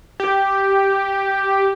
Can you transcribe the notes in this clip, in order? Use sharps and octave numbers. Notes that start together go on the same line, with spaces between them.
G4